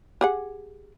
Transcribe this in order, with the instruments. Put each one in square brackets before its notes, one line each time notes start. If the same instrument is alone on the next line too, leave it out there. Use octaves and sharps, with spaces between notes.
[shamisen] G4 G#4 F#5